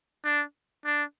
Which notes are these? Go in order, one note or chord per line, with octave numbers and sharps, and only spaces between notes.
D4
D4